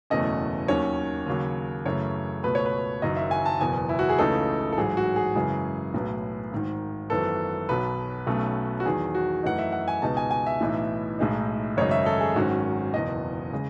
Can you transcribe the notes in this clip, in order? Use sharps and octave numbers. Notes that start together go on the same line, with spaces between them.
F#1 E2 B2 A3 C#4 D#5
D#2 D#3 F#3 C#4 C#5
D#2 C#3 F#3
F#2 C#3 E3 A3 C#4 C#5
C#2 B2 A3 B4
C#5
B4
F#1 F#2 D#3 F#3 D#5
E5
G#5
A5
F#1 E2 B2 G#5
E4
F#4
G#4
C#2 C#3 E3 A3 D#4 A4
A4
A1 G#2 F#3 G#4
F#4
G#4
F#2 C#3 E3 G#3
B1 A2 F#3 B3
G#1 G#2 D#3
G#1 F#2 E3 B3 A4
B1 B2 F#3 B4
B1 B2 F#3 A3 C#4
F#4
E2 D#3 F#3 G#4
F#4
F#2 E3 A3 D#4 F#5
E5
F#5
G#5
C#2 B2 G#3 B3 D#4 A5
G#5
G#5
E5
B1 A2 E3 B3 D#4
B1 A2 G#3 D#4
G#1 F#2 C#3 G#3 D#4 C#5
E5
A4
G#4
G#1 G#2 D#3 F#3 C#4 F#4
F#1 E2 B2 D#5
C#3 G#3